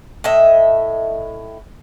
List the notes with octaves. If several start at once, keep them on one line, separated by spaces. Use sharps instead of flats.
A2 D#5 E5